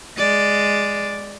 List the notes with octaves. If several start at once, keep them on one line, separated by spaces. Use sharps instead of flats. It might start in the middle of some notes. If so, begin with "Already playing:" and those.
G#3 D5